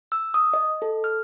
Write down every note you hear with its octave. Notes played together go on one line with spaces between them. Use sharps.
E6
D#6
D#5
A4
F6